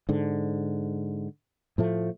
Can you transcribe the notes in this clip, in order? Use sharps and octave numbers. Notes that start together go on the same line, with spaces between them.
G#2 D3
A2 F3 A3